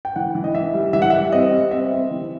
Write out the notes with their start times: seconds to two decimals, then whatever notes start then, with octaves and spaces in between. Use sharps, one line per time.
0.05 G5
0.16 E3 F#5
0.35 E3
0.44 D#5
0.54 E3 E5
0.74 G3
0.93 E3 E5
1.02 F#5
1.10 G3 E5
1.32 C4 D#5
1.52 G3
1.71 C4 E5
1.92 C4
2.11 E3